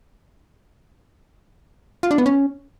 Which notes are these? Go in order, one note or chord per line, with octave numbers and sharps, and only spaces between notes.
F4
D4
B3
C#4